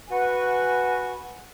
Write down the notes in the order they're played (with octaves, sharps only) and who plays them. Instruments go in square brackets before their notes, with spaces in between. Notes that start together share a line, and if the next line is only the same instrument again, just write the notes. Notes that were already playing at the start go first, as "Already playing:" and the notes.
[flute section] F#4 B4 G#5 C#6